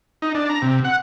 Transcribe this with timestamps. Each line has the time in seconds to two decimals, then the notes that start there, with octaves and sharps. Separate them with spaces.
0.22 D#4
0.34 D4
0.49 A#5
0.62 C3
0.84 F#5